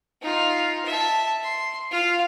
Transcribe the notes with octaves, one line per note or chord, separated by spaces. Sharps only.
D#4 F4
E5 A5
C6
F4 F5